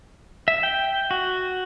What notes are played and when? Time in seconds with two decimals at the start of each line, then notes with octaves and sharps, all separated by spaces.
0.48 E5
0.63 G5
1.11 F#4